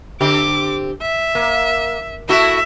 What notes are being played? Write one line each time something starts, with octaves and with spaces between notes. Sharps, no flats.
D3 C4 G4 D6
E5
A#3
A3 E4 F#4 E5